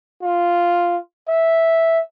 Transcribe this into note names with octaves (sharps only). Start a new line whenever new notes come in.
F4
E5